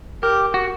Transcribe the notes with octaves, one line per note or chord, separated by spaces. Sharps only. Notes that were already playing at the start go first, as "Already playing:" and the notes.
G4 A#4
F#4